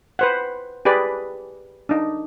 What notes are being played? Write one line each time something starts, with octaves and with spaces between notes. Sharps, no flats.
B4 C5 F#5
G4 G#4 B4 D5
D4 D#4